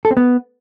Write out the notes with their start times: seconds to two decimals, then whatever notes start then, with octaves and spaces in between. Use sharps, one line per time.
0.05 A4
0.11 C4
0.17 B3